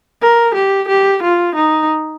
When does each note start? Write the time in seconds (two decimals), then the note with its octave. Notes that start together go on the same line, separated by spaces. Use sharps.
0.22 A#4
0.55 G4
0.88 G4
1.23 F4
1.56 D#4